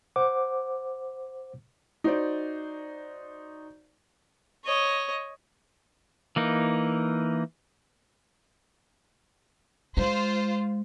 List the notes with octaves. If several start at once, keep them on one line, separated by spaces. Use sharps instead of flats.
C5 F#5 D6
D#4 F#4 C5 D5
C#5 D#5
E3 A#3 D#4
G#3 F4 C5